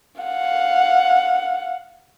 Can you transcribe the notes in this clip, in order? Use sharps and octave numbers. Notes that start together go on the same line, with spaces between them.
F5 F#5